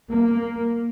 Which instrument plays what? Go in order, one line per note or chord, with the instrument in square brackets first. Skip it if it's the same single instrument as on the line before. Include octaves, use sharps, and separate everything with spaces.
[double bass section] A#3